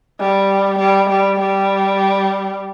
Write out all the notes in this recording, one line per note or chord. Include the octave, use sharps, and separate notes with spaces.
G3
G3
G3
G3